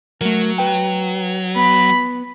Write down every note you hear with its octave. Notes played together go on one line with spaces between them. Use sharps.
F#3 A3 A#4
B4 G5
B3 B5